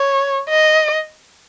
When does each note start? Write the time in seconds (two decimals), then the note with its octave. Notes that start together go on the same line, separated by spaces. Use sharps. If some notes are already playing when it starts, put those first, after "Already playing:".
Already playing: C#5
0.49 D#5